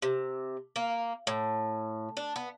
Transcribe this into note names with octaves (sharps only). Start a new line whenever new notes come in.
C3
A#3
A2
D4
B3